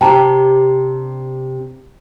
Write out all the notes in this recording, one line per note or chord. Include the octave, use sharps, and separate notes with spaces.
C3 D4 G4 G5 A5 A#5